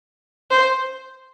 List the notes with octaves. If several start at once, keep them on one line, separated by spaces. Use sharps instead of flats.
C5